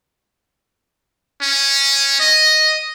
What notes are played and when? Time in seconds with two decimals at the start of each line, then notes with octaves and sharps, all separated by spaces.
1.42 C#4
2.20 D#5